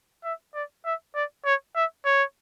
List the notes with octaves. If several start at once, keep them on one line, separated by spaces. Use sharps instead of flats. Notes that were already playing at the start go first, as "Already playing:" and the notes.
E5
D5
E5
D5
C#5
E5
C#5